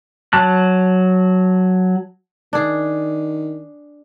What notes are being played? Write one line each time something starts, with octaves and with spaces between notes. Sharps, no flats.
F#3 A5 F#6
D#3 D4 G#4